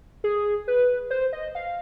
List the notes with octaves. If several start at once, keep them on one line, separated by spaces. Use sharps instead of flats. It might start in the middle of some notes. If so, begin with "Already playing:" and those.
G#4
B4
C5
D#5
F5